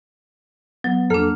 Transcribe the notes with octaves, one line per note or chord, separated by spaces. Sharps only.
F#3 B3
F2 A#3 D4 A4 F6